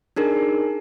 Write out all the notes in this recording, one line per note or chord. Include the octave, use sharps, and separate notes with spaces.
D4 D#4 G#4 A#4